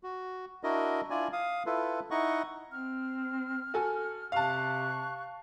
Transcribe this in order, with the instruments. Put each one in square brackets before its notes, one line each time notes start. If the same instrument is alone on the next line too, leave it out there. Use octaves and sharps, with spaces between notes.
[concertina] F#4
D4 E4 F#4 A#4 D#5
D4 E4 F4 D5 G#5
F5 D#6
E4 F4 A4 B4
D#4 E4 D#5 F#5 C#6
[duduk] C4 [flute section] F6
[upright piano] F#4 A4 G#5
[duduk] C3 [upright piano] F5 A5 [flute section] C#6 F#6